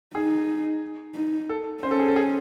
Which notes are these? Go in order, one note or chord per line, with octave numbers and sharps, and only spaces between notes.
D#4 G#4
D#4
A4
C#4 C5
A4
G#4
A4
G#4